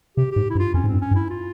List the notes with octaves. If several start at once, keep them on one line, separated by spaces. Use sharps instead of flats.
C3 G4
G#2 G4
E4
G2
F4
F2 C#4
G#2
G2 C4
C#4
G2
E4
F4